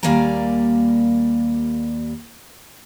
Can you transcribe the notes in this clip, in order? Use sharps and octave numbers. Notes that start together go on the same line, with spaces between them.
D#2 G3 A#3 D5 G#5 A#5